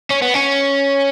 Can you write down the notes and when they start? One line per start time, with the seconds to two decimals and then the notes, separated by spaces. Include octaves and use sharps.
0.10 C#4
0.22 B3
0.34 C#4